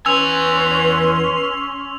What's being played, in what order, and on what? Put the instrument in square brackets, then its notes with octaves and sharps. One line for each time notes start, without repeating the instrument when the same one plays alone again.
[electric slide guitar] E2 G#5 [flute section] C#4 C6 [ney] B4 [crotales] E6 F7